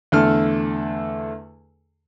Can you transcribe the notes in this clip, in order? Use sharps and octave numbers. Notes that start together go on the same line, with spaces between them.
E2 D3 A3 A4 F6